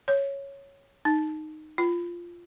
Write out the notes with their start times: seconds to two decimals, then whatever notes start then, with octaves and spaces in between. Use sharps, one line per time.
0.08 C#5
1.05 D#4
1.78 F4